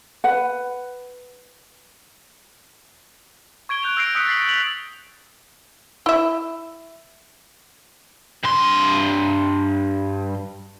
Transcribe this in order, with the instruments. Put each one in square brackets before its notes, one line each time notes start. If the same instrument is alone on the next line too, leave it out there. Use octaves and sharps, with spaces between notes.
[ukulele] B4 F#5
[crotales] C#6 G#6 D7 G7
F#6 G6 D7 F7
E6 G6 A#6 C7 D7
D#6 E6 F#6 B6 C#7
A6 B6 C7 F#7
F7 F#7
[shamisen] E4 E5
[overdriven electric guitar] G2 C6